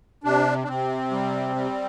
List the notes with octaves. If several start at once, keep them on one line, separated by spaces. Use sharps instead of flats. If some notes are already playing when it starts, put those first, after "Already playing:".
C3 D4
D4
C3 C4
G3
G3